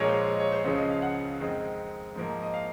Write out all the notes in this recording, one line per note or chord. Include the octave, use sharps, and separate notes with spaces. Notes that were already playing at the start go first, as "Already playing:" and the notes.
Already playing: A#1 A#2 G#3 C#5
C5
D#5
C#5
C5
C#2 C#3 F3 C#5
D#5
F5
F#5
F2 D#3 G#3 C4 D#4
G#2 F3 A#3 D#4
D#5
F5